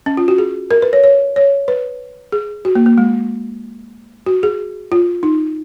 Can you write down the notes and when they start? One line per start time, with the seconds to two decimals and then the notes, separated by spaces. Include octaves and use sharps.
0.06 C#4
0.17 F4
0.28 F#4
0.38 G#4
0.71 A#4
0.82 B4
0.93 C#5
1.04 C#5
1.36 C#5
1.68 B4
2.32 G#4
2.65 F#4
2.75 A#3
2.86 A#3
2.98 G#3
4.26 F#4
4.43 G#4
4.92 F4
5.23 D#4